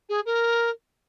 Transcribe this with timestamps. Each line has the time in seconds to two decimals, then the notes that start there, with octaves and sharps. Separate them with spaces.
0.09 G#4
0.26 A#4